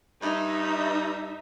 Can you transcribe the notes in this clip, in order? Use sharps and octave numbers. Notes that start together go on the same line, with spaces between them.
G2 D#4 E5